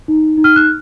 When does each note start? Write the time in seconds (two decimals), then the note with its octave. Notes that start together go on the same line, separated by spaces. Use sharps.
0.08 D#4
0.37 D#4
0.44 F6
0.56 F#6